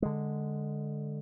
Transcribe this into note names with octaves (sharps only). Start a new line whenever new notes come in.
D3 G#3